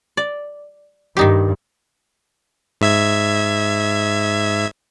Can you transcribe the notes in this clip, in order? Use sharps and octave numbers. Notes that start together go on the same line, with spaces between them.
D5
G2 D#3 D#4 G4
G#2 E5 G#6